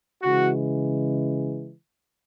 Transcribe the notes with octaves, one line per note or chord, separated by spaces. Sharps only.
C#3 E3 G#3 F#4